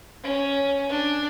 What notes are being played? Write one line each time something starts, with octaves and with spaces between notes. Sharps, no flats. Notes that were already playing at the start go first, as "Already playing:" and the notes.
C#4
D4